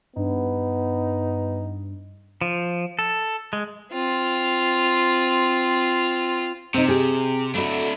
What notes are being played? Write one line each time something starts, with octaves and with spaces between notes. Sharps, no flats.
G2 B3 D#4
F3
A4
G#3
C4 F4
C3 C4 D#4
G4 G#4
A3 D4 E4 F#4